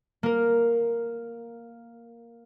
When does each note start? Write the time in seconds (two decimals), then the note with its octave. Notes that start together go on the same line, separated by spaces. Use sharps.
0.23 A#3 A#4